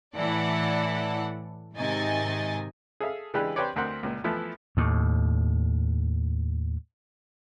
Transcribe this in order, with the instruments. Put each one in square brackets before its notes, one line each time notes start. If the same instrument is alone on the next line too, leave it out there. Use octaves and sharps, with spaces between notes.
[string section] A2 E3 E4 A4 D5 F#5
G#2 C3 D#3 D#5 G#5 A6
[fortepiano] G#4 A4 E5 F5
C#3 E3 G#3 D4 G4 B4
C4 G4 B4 C#5 D5
D2 C4 A#4 F#5
C#2 A#2
E3 F3 A3 B3 E4
[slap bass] D#2 A2